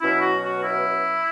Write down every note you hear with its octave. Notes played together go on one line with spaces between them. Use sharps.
B2 F#3 C#4 E4
F#4
F#4
E4